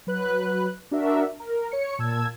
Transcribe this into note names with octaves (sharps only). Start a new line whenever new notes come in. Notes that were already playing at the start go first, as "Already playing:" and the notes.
F#3 B4 F#6
D4 F#4 A#4 E5
A#4
C#5 C#7
A#2 A5 E6 G#6